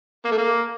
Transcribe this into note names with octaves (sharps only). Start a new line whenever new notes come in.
A#3
A3
A#3